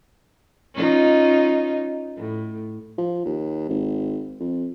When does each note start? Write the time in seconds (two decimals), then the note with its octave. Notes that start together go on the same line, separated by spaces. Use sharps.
0.75 C#4 D#4 F4
2.16 A2
2.98 F3
3.25 D#2
3.69 G#1
4.40 F2